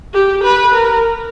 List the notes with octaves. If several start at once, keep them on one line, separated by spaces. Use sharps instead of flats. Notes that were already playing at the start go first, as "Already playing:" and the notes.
G4
B4
A#4